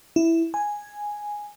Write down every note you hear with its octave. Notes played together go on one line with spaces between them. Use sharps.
E4
G#5